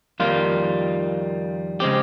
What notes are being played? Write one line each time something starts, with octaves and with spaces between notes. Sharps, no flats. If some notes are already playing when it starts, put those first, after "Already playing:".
F2 D#3 G3 A#3 F4
C#3 G#3 C4 G4